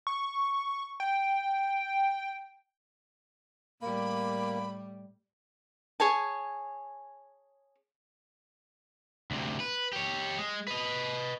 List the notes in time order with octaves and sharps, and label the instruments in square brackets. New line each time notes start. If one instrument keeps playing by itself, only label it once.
[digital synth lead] C#6
G5
[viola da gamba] A2 G3 [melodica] A#3 [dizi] B5
[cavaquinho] G#4 C#5 G#5 A5
[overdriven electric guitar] D2 C3
B4
G4 C#5
G#3
B4 D#5